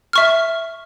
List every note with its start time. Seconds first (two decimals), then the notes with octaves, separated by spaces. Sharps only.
0.13 E5 C#6 F6